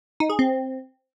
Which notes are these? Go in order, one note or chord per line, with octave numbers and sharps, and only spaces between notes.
D#4
G#4
C4